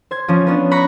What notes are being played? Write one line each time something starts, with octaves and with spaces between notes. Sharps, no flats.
C5 G#6
F3 C#4
B3 C#4 D4
A#5 B5 C#6 F#6